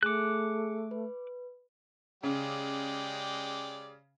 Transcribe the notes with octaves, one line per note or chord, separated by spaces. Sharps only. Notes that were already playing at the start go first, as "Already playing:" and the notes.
A3 G#4 D6 F#6 C#7
B4
C#3 G#3 G4 D5